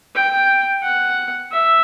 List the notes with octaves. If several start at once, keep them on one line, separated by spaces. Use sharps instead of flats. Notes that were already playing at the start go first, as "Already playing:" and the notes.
G5
F#5
E5